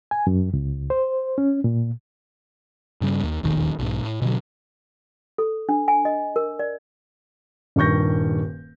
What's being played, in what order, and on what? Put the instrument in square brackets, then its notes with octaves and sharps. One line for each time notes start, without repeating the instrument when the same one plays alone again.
[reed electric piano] G#5
F#2
C#2
C5
C#4
A#2
[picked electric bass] G2 C#3 G3
D#2
E1 A#1 D#2 D#3
B1 G#2
A2
B2 D3 F#3
[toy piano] A4
D4
G#5
D#5
A#4
D5
[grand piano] D#1 G2 D#3 C#6 G6 A#6